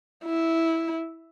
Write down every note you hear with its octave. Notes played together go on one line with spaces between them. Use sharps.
E4